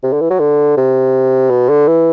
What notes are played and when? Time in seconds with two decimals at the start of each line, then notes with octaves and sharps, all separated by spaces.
0.03 C3
0.13 D3
0.21 E3
0.30 F#3
0.40 D3
0.77 C3
1.50 B2
1.69 D3
1.88 E3